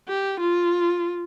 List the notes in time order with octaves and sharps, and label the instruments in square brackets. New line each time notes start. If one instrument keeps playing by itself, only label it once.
[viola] G4
F4